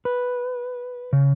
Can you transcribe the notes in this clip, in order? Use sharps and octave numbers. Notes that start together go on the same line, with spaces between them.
B4
C#3